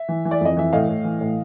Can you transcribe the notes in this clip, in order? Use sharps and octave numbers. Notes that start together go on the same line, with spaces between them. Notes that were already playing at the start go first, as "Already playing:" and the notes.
Already playing: E5
E3
E3
D5
F2 D#5
E3 E5
A2 D#5 F5
A2
E3
A2